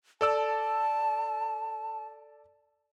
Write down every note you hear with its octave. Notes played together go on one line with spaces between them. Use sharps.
A4 D5 A5 E6